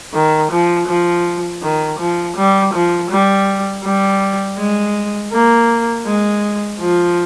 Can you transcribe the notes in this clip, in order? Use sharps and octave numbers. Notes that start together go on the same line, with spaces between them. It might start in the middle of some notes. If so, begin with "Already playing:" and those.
D#3
F3
F3
D#3
F3
G3
F3
G3
G3
G#3
A#3
G#3
F3